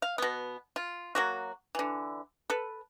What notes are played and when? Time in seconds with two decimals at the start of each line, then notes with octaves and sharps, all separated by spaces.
0.02 F5
0.18 B2 B3
0.76 F4
1.15 F#3 A#3 F#4
1.75 D3 E3
2.50 A4 B4